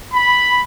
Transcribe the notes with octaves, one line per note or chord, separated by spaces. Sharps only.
B5